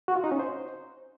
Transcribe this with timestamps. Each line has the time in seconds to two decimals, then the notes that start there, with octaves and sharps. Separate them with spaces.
0.08 F#4
0.16 F4
0.24 D#4
0.32 C#4
0.39 C5